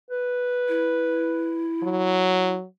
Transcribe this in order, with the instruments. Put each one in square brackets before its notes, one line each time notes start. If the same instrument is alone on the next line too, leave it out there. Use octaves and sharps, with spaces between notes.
[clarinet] B4
[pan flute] E4
[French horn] F#3